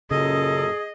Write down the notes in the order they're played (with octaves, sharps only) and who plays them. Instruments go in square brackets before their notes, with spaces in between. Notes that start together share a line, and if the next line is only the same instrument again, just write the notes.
[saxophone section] F#2 A#2 A4 [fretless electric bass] C#3 [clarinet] G#4 [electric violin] D#5